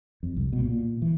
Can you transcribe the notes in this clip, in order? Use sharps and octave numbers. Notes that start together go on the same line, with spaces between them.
F2
C2
B2
A#2
E3